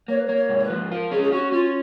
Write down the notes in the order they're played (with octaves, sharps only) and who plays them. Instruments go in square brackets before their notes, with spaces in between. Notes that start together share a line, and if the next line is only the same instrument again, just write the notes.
[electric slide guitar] A#3 [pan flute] C#5
[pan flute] B4
C#5
[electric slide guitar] A#3
[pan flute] C#5
[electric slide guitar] G#2
[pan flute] C#5
B4
[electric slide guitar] F3
[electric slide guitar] F4 [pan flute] A#4
[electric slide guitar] C#4 [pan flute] G#4
[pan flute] G#4
[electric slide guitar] C#4 [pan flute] F#4
[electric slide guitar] C#4 [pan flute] F4